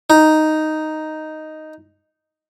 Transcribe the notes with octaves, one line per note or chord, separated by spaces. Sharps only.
D#4